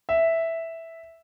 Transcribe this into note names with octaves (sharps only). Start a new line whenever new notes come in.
E5